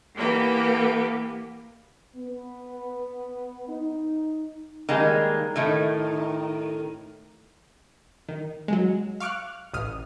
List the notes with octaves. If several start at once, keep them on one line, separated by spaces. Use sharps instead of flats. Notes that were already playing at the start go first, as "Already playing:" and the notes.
E3 A#3 B3 G4
B3
D#4
D#3 G3 G#3 A#3
A2 D#3 A3
D#3
F#3 G#3
F5 C#6 D6 F6 F#6
A1 D#6 F6